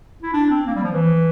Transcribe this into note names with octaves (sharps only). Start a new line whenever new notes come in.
E4
D4
C4
A#3
G3
F3
E3